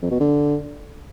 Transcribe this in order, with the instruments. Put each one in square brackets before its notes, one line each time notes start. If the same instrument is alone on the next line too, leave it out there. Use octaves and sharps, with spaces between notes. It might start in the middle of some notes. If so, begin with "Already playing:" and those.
[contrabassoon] F2
B2
D3